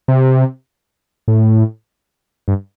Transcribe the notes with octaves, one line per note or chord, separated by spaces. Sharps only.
C3
A2
G2